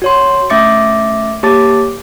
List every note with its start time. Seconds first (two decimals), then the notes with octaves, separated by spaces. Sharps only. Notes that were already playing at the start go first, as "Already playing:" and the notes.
0.02 F#4 C#5 C6
0.50 A3 C#4 E5 D6 A6 C#7
1.43 A#3 G4 C#5 A5 D6 A6